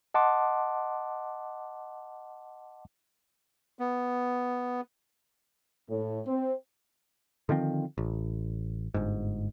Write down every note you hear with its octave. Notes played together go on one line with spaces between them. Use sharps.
D#5 F#5 A5 C6 D6
B3
A2
C4
D3 D#3 F3 C4
A1
G1 G#2